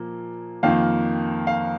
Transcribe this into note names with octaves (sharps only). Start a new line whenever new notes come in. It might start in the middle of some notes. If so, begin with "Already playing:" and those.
Already playing: A#2 F3 A#3
F2 D#3 A#3 F5
F5